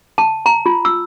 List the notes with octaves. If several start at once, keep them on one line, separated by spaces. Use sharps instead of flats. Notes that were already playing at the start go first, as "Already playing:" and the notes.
A5
A#5
F4
E6